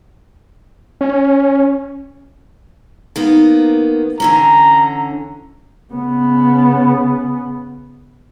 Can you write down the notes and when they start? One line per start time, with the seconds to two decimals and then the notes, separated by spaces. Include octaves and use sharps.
1.01 C#4
3.16 D#3 A#3 B3
4.20 D3 E3 C#4 A#5
5.93 C#3 B3